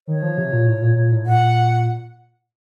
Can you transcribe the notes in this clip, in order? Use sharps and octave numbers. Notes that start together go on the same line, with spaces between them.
D#3 C#5
F3
C3
A#2
A2
A#2
A#2
A2
A#2 F#5